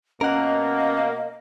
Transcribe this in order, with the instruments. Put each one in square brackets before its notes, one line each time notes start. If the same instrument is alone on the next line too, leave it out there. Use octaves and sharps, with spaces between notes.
[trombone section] B2 A#3 [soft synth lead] C#4 [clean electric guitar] A#4 F#5 [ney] D#5